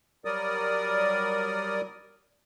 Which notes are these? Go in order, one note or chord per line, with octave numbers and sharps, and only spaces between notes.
F#3 G3 A#4 D5 D#6